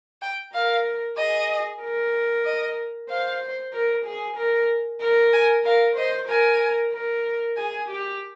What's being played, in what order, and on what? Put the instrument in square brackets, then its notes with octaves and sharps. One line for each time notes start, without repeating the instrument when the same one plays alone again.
[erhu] G5
[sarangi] A#4 [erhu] F5
[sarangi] G#4 [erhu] D#5
[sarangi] A#4
[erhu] D#5
[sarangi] C5 [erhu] F5
[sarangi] A#4
G#4
A#4
A#4
[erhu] G#5
[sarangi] A#4 [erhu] F5
[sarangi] C5 [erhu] D#5
[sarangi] A#4 [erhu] G#5
[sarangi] A#4
[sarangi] G#4 [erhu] G#5
[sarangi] G4